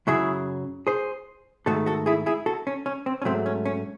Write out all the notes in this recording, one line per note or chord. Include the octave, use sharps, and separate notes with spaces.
F#2 C#3 F#3 E4 G#4
G#4 C5
G#2 D#3 A3 F#4 A4
F#4 A4
E4 G#4
E4 G#4
F#4 A4
C#4
C#4
C4
C#4
G#2 F#3 A3 C4
C#4
C#4